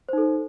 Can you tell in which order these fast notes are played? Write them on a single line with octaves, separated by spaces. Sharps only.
C5 D#4 A4